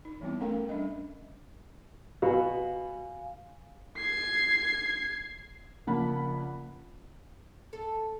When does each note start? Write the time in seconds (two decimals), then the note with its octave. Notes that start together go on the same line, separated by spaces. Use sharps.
0.05 D#4
0.21 E3 G3 B3 C4 E4
0.41 A3 C#4 A4 A#4 F5 G5
0.56 A#4
0.69 G3 D4 D#5
2.22 B2 B3 F#4 F5 G#5
3.97 G#6 C7
5.87 A#1 C#3 A#3 F#5 A5 B5
7.73 A4